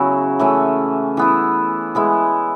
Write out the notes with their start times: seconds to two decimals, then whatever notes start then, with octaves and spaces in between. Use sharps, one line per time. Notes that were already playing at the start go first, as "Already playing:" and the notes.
Already playing: C#3 F#3 B3 E4
0.39 E3 A3 C#4
1.17 E3 B3 E4
1.95 G#3 B3 E4